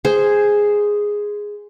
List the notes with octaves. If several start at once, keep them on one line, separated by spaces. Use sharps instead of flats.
G#4 C5